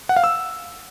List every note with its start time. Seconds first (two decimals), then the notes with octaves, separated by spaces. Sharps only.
0.09 F#5
0.16 F5
0.24 E6